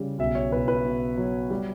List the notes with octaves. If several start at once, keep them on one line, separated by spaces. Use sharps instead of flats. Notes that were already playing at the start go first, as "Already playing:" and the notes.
Already playing: C#3 G3
B1 E5
C#5
B1 B4
B4
B2
F#3
G3